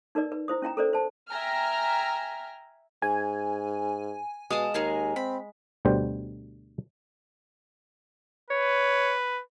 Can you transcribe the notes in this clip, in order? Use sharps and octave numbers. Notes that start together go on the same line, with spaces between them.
D#4 A#4 B4 D5
B4
E4 C5 D#6
C#4 E4 G5 A#5
A4 A#4 C5 D5
C5 A5
E5 G5 G#5 A#5 F6
G#2 G#5
B2 G#3 F5 A5 D#6
D#2 D#4 G#4 A#4
C4 B5
D2 B2 D3 G3 C5
B4 C#5